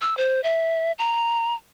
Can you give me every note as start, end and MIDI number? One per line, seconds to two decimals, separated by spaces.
0.01 0.17 88
0.17 0.43 72
0.44 0.92 76
0.99 1.54 82